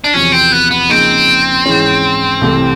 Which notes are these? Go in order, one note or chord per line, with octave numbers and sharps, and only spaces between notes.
D4
E2 C3 F3 C#4
C4
B3
B3
C#3 F3 A#3 C4 D#4
G#2 E3 G#3 C#4 E4
C2 C3 E3 A3